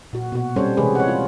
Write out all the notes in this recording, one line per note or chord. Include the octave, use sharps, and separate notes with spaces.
A#2 F#4
B2 F#4
G3 C4 C#4 A4 C5 C#5
C3 E3 G#3 G4 G#4 B4
C#5 F#5
F4